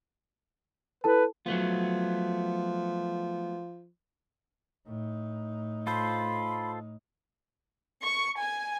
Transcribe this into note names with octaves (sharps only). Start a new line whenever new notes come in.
E4 A4 B4 A5
F3 F#3 A3 B3
A2 D#4
F4 A4 C5 B5
C#6
G#5